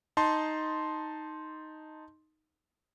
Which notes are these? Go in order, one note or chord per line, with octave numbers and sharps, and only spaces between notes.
D#4 A5 C6